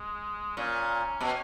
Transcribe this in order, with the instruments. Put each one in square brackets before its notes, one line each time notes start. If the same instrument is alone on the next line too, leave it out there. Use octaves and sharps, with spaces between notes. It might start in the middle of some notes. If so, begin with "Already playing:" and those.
Already playing: [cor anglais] G#3
[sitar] A#2 [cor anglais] C#4
[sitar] B2